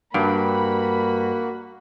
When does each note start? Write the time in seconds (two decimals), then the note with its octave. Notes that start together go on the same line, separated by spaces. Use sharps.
0.14 G2 A#3 F#4 B5